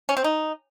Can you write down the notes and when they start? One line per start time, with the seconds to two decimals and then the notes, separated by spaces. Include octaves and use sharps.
0.09 C#4
0.17 C4
0.24 D#4